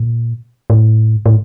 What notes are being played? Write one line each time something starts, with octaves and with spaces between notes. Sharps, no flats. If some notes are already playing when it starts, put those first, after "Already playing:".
Already playing: A#2
A2
A2